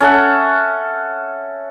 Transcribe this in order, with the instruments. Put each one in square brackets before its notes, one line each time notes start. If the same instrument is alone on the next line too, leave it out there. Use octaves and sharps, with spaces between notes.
[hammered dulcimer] C#4 A4 E5 F#5